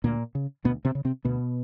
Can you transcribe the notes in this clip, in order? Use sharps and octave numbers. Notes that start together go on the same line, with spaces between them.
D2 A#2 A#3
C#3
D2 B2 B3
C3 C4
C#3
C3 C4
D2 B2 B3